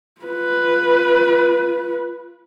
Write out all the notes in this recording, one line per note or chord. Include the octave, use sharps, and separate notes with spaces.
F4 B4